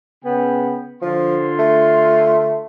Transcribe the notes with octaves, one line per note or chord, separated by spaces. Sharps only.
C#3 B3 G5
D3 F3 F4 C6
A3